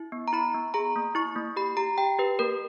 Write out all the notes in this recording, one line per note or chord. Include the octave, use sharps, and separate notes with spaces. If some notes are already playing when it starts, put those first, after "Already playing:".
Already playing: E4
B3
A#5
E4 B5
B3
G#4 A#5
A#3
E4 C#6
A#3
G4 B5
G4 A#5
G4 G5
G4 B4
A#3 A#4